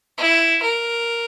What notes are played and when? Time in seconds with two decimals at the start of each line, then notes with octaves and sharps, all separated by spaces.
0.18 E4
0.62 A#4